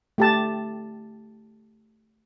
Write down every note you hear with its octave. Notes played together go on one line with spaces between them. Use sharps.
A3 G4 A5